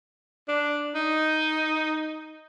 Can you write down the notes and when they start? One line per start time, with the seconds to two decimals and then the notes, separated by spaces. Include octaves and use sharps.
0.48 D4
0.95 D#4